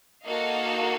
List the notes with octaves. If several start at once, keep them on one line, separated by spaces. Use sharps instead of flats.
A#3 D#4 F#4 A4 D#5 F5